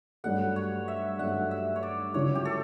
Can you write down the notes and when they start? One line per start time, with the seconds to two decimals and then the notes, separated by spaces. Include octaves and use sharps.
0.24 G2 F#3 A3 F#5
0.56 C#5
0.88 E5
1.19 G2 F#3 A3 F#5
1.51 E5
1.76 C#5
1.83 D5
2.14 C#2 C#3 F#3 C#4 E4 C#5
2.35 G4
2.45 A4